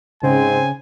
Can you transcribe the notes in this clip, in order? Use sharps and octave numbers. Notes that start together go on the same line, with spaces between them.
G#2 C#3 C4 G#5